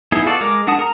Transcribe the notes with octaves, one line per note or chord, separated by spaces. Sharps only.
B3 D#4 E4 G#4
F4 F#4 A4 D5
G#3 A#4 D6
G#3 D4 F#5 A5 D#6
A#4 A#5